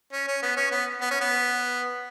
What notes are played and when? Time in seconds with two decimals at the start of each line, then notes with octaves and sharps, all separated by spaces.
0.12 C#4
0.27 C#4
0.42 B3
0.57 C#4
0.71 B3
1.01 B3
1.11 C#4
1.21 B3